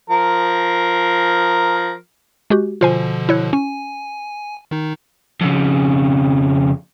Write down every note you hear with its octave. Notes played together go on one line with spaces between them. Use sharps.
F3 A#4
G#3 F#4 G4
B2 D3 F3 F4 C5 G#5
E4 C#5 F#6
C#4 G#5
D#3 D#4
F2 C#3